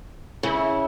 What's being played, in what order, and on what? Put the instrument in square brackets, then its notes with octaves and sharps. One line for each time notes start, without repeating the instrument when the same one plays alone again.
[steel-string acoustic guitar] C#3 [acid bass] E4